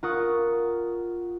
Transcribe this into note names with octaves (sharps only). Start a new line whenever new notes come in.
F4 A#4 F#5 C#6 D#6